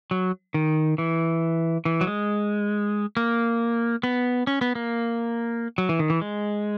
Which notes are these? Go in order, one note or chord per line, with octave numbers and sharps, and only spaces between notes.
F#3
D#3
E3
E3
F#3
G#3
A#3
B3
C#4
B3
A#3
F#3
E3
D#3
E3
G#3